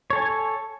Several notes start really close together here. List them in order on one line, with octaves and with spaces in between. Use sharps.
C#5 A4 G#5